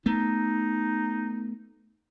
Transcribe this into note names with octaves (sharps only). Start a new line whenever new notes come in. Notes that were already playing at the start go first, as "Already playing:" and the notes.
A3 B3 D#4